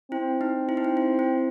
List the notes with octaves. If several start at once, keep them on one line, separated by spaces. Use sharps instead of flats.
C4 E4
D#4
E4
D#4
E4
E4
E4